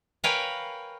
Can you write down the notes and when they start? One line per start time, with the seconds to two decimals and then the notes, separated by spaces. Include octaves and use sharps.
0.24 A#4 B4 C#5 F5 G5 G#5